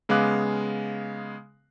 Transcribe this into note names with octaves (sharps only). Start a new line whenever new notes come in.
C#3 G#3 B3 F5 D6 F#6